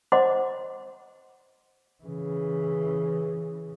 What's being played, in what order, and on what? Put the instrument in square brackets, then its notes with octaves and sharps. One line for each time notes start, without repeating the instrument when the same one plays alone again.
[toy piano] C5 D#5 F#5 C6 D6
[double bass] C#3 E3